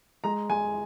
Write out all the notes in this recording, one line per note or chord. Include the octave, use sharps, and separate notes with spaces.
G#3 A#5
G#3 G#5